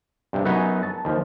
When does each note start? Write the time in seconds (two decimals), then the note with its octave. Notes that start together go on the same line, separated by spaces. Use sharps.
0.33 G2 C3
0.45 F#2 F#3 B3 D#4 F#5 G#5
0.83 A5
1.05 D#2 F3